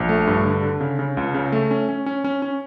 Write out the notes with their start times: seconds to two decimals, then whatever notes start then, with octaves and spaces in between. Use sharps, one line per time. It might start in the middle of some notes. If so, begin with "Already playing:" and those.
Already playing: A#1
0.09 A3
0.27 G2
0.45 D3
0.63 D3
0.81 C#3
0.99 C#3
1.17 C#2
1.34 C#3
1.52 A3
1.71 C#4
1.89 C#4
2.06 C#4
2.24 C#4
2.42 C#4